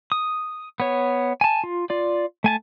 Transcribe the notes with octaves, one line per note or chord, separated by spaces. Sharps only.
D#6
B3 C#5
G#5 A5
F4
F4 D5
A3 G#5 A5